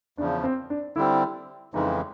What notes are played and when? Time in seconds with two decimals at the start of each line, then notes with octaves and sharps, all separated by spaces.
0.18 E2 C#3 F3 D4
0.44 C4
0.70 D4
0.96 D3 G3 C4 E4
1.74 F2 C#3 E3 G#3 D#4